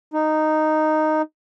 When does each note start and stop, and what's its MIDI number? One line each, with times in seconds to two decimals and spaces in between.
0.14 1.22 63